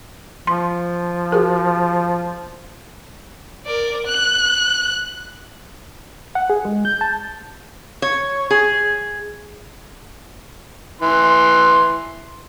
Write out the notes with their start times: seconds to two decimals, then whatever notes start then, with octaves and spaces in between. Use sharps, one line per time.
0.47 F3 C6
1.32 F#4 G#4 A#4
3.66 A#4 D5
4.07 F#6
6.35 F#5
6.50 G#4
6.65 G#3
6.85 G6
7.01 A5
8.02 C#5
8.51 G#4
11.02 E3 C6